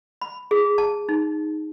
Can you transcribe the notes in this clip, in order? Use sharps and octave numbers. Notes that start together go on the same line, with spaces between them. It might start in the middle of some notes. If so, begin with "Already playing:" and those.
B5
G#4
A5
D#4